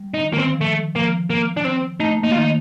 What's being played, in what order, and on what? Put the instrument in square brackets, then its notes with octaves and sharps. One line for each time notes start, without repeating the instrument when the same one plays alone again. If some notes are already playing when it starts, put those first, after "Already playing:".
Already playing: [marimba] G3
[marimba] D3 [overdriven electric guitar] D#4
[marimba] D#3
[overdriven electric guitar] A#3
C4
[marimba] F3
[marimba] D#3 [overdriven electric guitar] A3
[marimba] F3 [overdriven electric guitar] A#3
[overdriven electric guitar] A#3
D4
C4
[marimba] A3 [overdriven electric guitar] D#4
[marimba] A#3
[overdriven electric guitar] D#4
F4
[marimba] D#3 [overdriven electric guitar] D#4